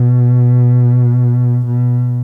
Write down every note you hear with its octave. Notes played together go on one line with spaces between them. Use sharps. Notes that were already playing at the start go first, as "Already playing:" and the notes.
Already playing: B2
B2